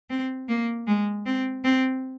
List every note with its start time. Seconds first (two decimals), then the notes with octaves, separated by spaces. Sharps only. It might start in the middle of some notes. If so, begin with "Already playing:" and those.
0.10 C4
0.49 A#3
0.87 G#3
1.26 C4
1.64 C4